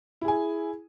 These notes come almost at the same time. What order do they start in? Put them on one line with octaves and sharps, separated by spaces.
E4 G#4 G#5